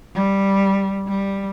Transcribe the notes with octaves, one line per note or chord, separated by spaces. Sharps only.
G3
G3